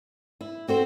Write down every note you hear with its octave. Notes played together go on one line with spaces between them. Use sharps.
E4
C4 F#4 A4 C5